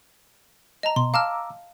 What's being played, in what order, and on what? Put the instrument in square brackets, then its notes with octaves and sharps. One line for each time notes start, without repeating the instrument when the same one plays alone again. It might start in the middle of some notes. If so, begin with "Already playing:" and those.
[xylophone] D#5 A5 A#5
[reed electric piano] B2 [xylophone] C6
[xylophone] F5 A5 F6 [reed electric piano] A#5 D6 E6